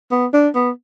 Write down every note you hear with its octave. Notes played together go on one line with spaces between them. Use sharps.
B3
D4
B3